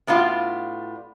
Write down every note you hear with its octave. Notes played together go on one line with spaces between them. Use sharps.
A2 B3 D4 F4 F#4